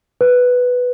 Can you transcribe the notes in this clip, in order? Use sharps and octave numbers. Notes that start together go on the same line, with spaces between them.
B4